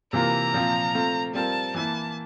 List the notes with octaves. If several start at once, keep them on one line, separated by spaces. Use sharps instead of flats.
C3 E3 A#3 F4 A#4 A#5
A#2 F3 C4 F4
A3 C4 F4
G3 C4 F4 A#4 A5
E3 A#3 E4 A5